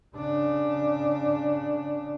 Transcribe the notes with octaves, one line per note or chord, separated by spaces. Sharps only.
C#3 D4